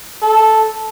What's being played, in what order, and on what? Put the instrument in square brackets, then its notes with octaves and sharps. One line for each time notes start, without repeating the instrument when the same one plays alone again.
[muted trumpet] A4